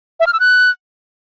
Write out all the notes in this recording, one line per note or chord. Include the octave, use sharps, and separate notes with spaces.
E5
F6
E6
F#6